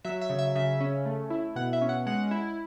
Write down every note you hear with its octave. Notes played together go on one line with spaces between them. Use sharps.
F#3 E5
E5
C#3
E5
C#3 E5
C#4
A3
E4
B2 F#5
E5
C#4
F#5
G#3 F#5
E4